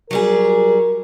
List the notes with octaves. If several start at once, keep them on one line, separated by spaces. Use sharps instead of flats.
F#3 G3 G#4 A#4